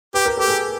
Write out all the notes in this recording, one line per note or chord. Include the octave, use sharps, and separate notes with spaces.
G4 B4
A#4
G4 A4
G#4 A#4